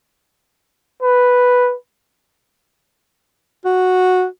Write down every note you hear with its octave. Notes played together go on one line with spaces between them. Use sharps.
B4
F#4